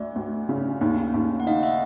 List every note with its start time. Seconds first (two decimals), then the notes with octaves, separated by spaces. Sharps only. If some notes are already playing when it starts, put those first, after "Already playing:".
Already playing: D2 D5 E5
0.16 D2
0.49 C#3
0.81 D#2
1.14 D#2
1.40 F#5
1.46 D#3 D#5 F5
1.63 E5 F#5